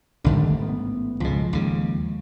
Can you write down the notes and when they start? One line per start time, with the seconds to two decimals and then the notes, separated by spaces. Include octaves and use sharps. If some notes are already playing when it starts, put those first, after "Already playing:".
0.24 A1 G#2 D3 D#3 G3 A3
0.62 B3
1.20 C#2 B2 F3 G#3
1.53 D#2 C#3